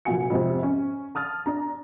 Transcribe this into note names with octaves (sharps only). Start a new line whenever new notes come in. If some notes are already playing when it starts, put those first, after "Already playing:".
F1 A#2 F#3 F#5 G#5 C#7
F2 G#2 C3
C#4
A5 D#6 F6 A6
D4 A#5